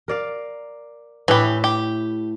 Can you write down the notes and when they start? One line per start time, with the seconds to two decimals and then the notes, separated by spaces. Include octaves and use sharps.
0.08 A#4 D5 F5
1.28 A2 E3 E4 G4 B4
1.64 G4